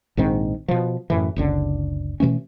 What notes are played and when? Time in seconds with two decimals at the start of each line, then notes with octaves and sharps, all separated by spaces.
0.17 A#1 G#2 D#3 C4
0.68 B2 F3
1.10 F#2 A2 E3
1.36 F#1 C#2 D3
2.20 B2 E3 A3 C#4